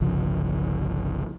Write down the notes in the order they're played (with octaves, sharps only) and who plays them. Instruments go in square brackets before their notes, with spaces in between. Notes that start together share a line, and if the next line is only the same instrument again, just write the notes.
[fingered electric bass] G1 C2 C#3 F3